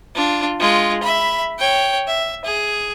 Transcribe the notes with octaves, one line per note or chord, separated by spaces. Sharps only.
D4 F4
G#3 F4
E5 B5
C#5 G5
E5
G#4